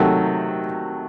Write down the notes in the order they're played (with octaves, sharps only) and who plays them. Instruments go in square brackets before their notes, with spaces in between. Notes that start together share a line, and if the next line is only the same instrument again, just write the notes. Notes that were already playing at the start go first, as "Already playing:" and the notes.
Already playing: [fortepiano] C3 D#3 F#3 A3